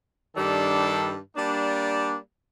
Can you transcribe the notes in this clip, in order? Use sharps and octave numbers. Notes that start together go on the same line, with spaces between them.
G2 D#3 G3 D4 A4
G3 A#3 D4